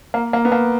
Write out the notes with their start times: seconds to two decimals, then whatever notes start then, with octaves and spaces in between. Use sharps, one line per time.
0.14 A#3
0.33 A#3
0.45 B3
0.52 A#3